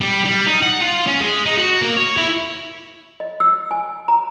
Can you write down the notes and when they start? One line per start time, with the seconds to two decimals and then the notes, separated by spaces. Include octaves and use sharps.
0.01 G3
0.25 G3
0.46 D#4
0.63 F#5
0.81 F4
1.07 C#4
1.20 G#3
1.46 D#4
1.57 F#4
1.82 A#3
1.97 C#5
2.17 E4
3.20 D#5
3.40 E6
3.71 G#5
4.08 A#5